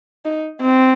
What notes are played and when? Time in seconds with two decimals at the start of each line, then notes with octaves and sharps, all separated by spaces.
0.25 D#4
0.62 C4